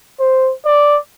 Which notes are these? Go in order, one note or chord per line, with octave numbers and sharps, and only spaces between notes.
C5
D5